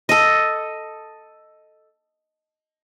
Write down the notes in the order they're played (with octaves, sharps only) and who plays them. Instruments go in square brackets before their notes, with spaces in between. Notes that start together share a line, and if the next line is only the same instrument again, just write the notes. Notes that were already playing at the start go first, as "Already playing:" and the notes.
[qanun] A4 D#5